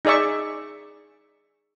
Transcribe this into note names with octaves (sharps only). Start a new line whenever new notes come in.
D#4 G#4 D5 E5 C#6